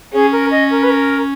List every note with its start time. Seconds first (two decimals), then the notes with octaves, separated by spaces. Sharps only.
0.13 C#4 G#4
0.32 A#4
0.51 D#5
0.71 A#4
0.83 B4
0.90 A#4